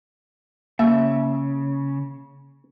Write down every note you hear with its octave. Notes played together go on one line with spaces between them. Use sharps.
C#3 A#3 E5